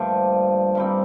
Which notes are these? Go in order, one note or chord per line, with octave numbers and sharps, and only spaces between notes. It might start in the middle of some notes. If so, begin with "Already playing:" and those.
Already playing: G2 A#2 D3 F3 A3
G2 D#3 G3 C4